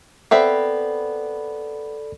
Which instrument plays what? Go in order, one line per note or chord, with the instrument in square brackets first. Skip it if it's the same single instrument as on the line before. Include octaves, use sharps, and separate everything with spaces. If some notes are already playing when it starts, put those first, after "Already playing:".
[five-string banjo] B3 C4 E5 [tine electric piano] A4 D5 B5